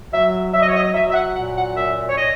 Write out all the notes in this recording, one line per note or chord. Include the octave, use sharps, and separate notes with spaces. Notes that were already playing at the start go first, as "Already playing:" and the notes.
F#3 E5
F#3 E5
D#5
C#5
D#5
F#3 E5
E5
F#5
A#2 F#5
F#5
F#2 E5
C#5
D#5